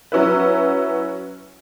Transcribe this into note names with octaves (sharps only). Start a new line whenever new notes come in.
F#3 C#4 E4 B4